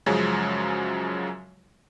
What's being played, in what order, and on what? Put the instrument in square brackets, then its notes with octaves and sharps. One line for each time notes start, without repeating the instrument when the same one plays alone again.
[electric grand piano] F#2 C#3 F3 F#3 G#3